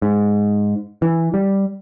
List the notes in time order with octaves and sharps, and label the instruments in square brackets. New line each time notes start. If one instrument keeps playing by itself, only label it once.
[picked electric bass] G#2
E3
G3